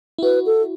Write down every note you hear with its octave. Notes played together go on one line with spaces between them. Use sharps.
E4
F#4 B4
A4